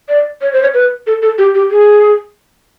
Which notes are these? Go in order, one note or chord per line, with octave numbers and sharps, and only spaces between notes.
D5
C#5
C5
C#5
B4
A4
A4
G4
G4
G#4